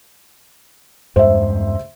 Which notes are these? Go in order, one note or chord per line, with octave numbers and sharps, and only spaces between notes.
E2 G2 G#3 C5 E5